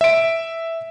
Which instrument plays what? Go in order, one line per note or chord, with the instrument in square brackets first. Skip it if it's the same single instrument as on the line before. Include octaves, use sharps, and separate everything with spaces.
[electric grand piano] E5 D7